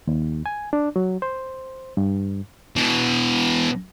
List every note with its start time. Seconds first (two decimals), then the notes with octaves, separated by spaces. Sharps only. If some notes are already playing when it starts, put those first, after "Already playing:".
0.07 D#2
0.46 G#5
0.73 D4
0.96 F#3
1.22 C5
1.97 G2
2.76 B2 E3